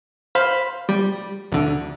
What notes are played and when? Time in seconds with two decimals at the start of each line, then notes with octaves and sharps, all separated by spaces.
0.35 C5 F5 B5
0.89 G3
1.52 D2 D3